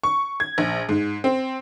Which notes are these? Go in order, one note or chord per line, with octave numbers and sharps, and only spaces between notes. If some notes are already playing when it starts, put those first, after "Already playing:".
C#6
G#6
A#1
G#2
C4